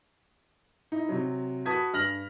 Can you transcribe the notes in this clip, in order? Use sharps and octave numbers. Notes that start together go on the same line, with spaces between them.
D#4 E4
C3 F#3
F#4 B4 A5 D#6 G#6 B6
G2 F6 A#6 F#7